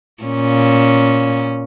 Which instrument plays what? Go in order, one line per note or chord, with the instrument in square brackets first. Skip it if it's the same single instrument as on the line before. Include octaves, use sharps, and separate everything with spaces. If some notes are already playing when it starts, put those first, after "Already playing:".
[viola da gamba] A#2 C#4